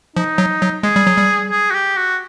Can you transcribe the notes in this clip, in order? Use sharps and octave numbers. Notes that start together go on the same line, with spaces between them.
F3 D#4
F#3
F#3
G#3 G#4
G3
F#3
G3
G#4
F#4
G4
F#4